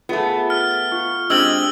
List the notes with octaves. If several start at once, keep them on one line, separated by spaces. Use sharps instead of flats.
A3 B3 F4 G#4 E5
F6 A6
F4 C#6
G#3 C4 D4 G4 E6 F6 F#7